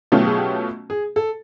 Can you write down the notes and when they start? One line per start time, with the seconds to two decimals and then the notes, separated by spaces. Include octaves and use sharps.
0.12 B2 F#3 A3 C#4 F4 G4
0.25 G#4
0.38 G4
0.90 G#4
1.16 A4